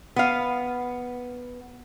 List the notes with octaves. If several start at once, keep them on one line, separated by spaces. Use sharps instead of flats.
B3 F5